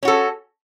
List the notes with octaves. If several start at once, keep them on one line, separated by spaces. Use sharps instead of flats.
C#4 F#4 A4